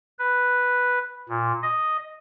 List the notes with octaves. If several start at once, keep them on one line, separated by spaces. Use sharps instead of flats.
B4
A#2
D#5